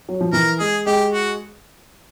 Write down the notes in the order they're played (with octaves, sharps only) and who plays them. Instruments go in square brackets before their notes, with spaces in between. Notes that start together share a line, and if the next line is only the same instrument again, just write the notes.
[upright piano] F#3
F3
[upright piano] E3 [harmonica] A#4
[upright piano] G#3 [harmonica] G#4
[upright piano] G#3 [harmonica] G4
[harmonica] F#4